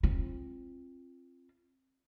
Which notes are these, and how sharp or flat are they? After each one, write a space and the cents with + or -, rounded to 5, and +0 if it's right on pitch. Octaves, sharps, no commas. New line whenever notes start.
C4 +25 F4 -15